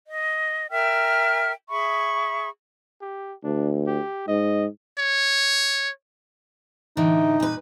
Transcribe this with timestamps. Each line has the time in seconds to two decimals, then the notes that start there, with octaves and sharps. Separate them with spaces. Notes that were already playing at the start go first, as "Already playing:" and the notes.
0.07 D#5
0.70 A#4 E5 G5 F6
1.69 G#4 E5 B5 C#6
3.01 G4
3.44 D2 D4
3.87 G4
4.28 G#2 D#5
4.99 C#5
6.97 A2 D3 E3 D#4
7.40 A#2 B4